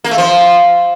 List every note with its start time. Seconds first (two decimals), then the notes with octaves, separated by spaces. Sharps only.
0.04 A#3
0.11 A3
0.18 F3